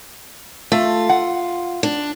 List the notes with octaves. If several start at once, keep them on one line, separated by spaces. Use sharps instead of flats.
A3 F4
F#5
D4